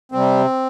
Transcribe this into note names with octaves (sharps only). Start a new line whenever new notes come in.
C3 G3 C4